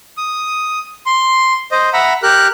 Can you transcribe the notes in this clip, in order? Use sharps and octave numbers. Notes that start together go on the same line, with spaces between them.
D#6
C6
C5 D#5
E5 F#5 A#5 B5
G4 A#4 F#6